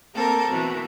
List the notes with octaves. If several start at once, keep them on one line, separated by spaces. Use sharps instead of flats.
A#3 C4 A4 A#4
B2 E3